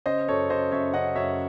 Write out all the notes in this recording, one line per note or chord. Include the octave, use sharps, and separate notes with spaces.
C#3 C5 D#5
F#2 A4 C#5
C#3 C5 D#5
F#2 C#5 E5
C#3 D#5 F#5
F#2 C#5 E5